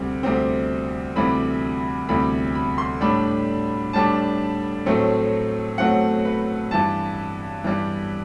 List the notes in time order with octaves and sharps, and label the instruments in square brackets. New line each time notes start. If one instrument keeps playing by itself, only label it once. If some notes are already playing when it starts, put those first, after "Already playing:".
Already playing: [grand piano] D2 C3 G3 C4
D2 C3 G3 C4
D2 C3 E3 G3 B5
D2 C3 E3 G3 B5
B5
C6
A2 G3 D4 B5
A2 G3 D4 A5
A2 F#3 A3 C4
A2 F#3 A3 C4 F#5
B4
G2 E3 G3 A5
G2 E3 G3